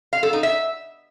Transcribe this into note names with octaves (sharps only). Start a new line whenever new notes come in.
F5
A4
D#4
E5